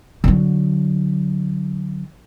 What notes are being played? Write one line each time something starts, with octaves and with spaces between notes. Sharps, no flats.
D3 F#3